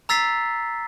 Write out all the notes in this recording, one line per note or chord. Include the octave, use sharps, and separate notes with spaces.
A#5 E6 A6 B6 C7